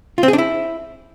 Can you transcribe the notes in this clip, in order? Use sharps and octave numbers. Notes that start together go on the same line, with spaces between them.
F4
C4
G#4
D4
E4